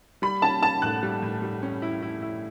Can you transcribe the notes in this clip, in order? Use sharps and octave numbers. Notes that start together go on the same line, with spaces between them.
G3 B5
C#4 A5
C#4 A5
A2 F#6
G3
A2
G3
C#4
E4
E4
E4